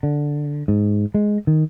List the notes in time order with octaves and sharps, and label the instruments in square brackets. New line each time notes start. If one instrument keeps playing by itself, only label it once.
[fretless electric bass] D3
G#2
G#3
D#3